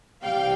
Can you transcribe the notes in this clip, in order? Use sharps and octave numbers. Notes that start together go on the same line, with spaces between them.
C2 C3 E3 G3 F5 G5